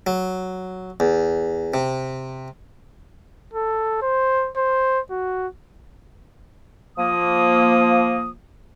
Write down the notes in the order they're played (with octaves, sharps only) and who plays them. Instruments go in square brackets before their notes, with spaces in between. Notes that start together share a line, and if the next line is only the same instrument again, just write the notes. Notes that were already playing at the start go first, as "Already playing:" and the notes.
[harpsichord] F#3
E2
C3
[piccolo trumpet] A4
C5
C5
F#4
[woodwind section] F3 A#3 D#6